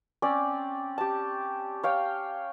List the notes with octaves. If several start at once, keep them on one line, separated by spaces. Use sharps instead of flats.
C4 C#4 D5
G4 A5
C#5 F5 G5